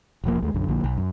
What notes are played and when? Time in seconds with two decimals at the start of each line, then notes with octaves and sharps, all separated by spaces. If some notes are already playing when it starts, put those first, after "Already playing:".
0.24 E1 A#1 F3 A#3
0.43 D#2 G#3 A3
0.54 B1 F#2 D3
0.68 A#1 D3 F3 A#3
0.84 B1
0.98 F#2